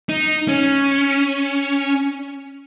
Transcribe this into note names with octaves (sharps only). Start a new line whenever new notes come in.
D#4
C#4